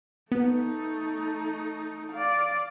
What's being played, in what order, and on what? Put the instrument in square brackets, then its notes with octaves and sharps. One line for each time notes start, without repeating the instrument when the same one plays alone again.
[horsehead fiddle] A3 D#4 [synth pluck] B3
[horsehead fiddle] D5 F5